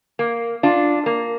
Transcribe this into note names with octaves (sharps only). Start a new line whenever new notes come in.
A#3
D4 F4
A#3